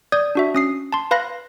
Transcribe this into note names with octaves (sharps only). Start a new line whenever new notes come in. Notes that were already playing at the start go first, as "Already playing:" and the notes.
D5 D#6 G6 G#6
D4 F#4 E5
C#4 D#6 C7
A5 C6
B4 F5 B5 F#6 A#6